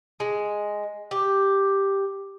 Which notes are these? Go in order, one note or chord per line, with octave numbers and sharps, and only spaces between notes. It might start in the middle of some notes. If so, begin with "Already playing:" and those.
G#3
G4